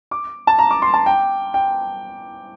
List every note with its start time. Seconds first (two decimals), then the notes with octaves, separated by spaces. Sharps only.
0.11 D6
0.47 A5
0.59 A#5
0.70 D6
0.82 C6
0.94 A5
1.06 G5
1.54 G5